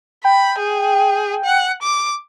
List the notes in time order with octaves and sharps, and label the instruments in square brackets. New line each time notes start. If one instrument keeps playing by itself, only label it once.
[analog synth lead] G5 [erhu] B5
[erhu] G#4
F#5
D6